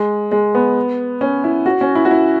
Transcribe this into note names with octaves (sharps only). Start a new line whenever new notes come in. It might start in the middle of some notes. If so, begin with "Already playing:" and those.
Already playing: G#3
G#3
B3
C#4
E4
F#4
C#4
E4
F#4
E4